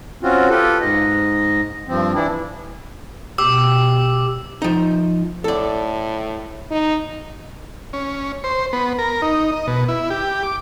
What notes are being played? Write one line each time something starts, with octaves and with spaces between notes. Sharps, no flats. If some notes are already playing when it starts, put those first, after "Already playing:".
C4 C#4 F4 F#4
F4 G4 A4 B4
G#2 D#5
G2 F3 C4
E3 D4 E4
B2 G4 D6 E6
F3 D#4
A2 A4 D5
D#4
C#4
C5
B3
A#4
D#4
D#5
B2
E4
G4
D6